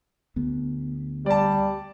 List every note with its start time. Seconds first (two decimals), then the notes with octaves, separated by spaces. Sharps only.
0.36 D2 B3
1.26 G3 D5 A5